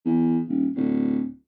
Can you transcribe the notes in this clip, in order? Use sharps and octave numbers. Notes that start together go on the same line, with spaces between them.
E2
D#1
D1